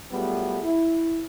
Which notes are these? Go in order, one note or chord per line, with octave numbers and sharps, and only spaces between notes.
F#3 G3 A3 B3 F4 G#4
E4